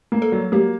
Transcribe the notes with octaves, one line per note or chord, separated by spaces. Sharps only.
A#3
A4
F#3
A#3 G4